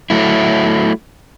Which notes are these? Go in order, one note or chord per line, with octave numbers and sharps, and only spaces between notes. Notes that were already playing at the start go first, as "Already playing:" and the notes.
F#3 A3 E4